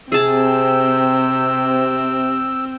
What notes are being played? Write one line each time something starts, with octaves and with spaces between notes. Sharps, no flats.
C3 C4 G#4 A5 E6